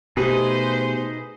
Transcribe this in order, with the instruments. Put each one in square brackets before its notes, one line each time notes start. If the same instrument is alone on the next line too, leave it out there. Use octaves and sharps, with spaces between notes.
[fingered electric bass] B2 A3 [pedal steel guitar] D#4 G#4 B4 [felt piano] G4 [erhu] C5